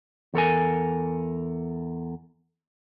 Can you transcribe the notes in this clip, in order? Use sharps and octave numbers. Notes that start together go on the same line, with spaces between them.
E2 A4 A#4 G#5